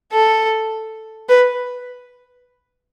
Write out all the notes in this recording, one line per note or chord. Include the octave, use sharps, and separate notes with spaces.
A4
B4